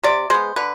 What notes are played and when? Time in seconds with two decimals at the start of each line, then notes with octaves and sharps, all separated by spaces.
0.03 C3 D5
0.30 G#3 B3 C5
0.56 D3 B4